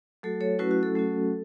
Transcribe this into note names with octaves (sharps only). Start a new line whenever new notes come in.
F#3 A3 F#4 A4
A4 C#5
F#3 A3 C#4 E4 F#4 B4
F#4
A4
F#3 A3 C#4 F#4